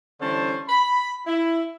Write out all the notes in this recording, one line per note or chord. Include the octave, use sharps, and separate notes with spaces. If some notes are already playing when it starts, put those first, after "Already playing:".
D3 E3 G3 C#4 C5 A5
B5
E4